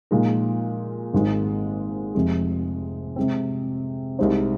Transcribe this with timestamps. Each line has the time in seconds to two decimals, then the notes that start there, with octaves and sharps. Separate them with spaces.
0.11 A#2 F3 G#3 D#4 A#4
1.14 G#1 G#2 G#3
2.15 F1 F2 C3 G#3
3.16 C3 G#3 C4
4.19 C2 C3 G#3 D#4 C5